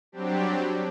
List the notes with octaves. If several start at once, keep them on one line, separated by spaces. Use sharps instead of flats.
F#3 G3 C4 D4 G4